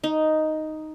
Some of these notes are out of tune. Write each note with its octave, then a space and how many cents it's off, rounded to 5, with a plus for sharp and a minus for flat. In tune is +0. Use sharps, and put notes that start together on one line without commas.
D#4 +0